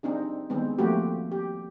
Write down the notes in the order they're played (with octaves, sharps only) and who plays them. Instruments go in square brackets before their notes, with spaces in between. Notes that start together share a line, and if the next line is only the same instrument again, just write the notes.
[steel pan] C4 D4 D#4 G#4
D#3 G#3 B3 C4
F3 A3 A#3 C4 F#4 G4
G4